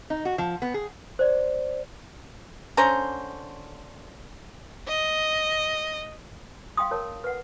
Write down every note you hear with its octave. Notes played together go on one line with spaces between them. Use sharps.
D#4
F#4
F3
B3
G#4
C5 D5
D3 C#4 C5 A#5
D#5
F5 G5 C6 D#6
A#4 C#5 A5
B4 F#5